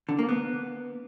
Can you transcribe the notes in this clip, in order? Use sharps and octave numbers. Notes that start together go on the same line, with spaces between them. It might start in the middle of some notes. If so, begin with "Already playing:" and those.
D3
A#3
B3